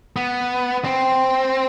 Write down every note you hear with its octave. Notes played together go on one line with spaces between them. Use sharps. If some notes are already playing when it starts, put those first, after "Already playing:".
B3
C4